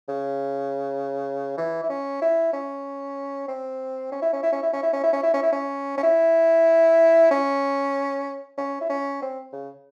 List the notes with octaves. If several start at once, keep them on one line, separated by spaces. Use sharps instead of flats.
C#3
E3
E4
C#4
E4
C#4
C4
C#4
E4
C#4
E4
C#4
E4
C#4
E4
C#4
E4
C#4
E4
C#4
E4
C#4
C#4
E4
C#4
C#4
E4
C#4
C4
C#3